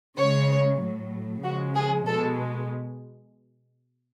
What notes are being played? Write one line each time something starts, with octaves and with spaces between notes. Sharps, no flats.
C#3 G#3 C#5
A2 F#3
C#3 F3 G#3 F#4
G#4
B2 G#3 A4